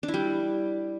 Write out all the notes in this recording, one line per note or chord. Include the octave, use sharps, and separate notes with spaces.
D4
E4
G3